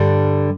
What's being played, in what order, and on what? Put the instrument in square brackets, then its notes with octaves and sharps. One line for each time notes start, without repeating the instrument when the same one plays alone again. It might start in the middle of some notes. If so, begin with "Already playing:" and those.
Already playing: [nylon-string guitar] G2 D3 G3